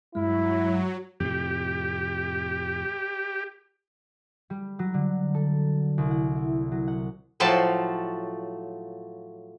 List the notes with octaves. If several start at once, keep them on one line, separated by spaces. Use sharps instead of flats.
G2 F#3 G#3 E4
F2 A2 C3 G4
G3
F#3
D3
A4
C2
F#5
E4
F#3
F#5
A2 F3 F#3 A5